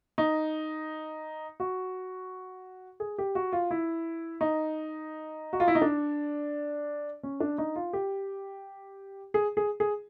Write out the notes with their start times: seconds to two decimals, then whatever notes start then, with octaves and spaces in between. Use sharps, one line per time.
0.18 D#4
1.60 F#4
3.00 G#4
3.18 G4
3.35 F#4
3.53 F4
3.71 E4
4.41 D#4
5.53 F#4
5.60 F4
5.68 E4
5.75 D#4
5.82 D4
7.23 C#4
7.40 D4
7.58 D#4
7.76 F4
7.93 G4
9.34 G#4
9.57 G#4
9.80 G#4